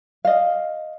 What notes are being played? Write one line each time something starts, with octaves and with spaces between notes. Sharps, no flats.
D#5 F5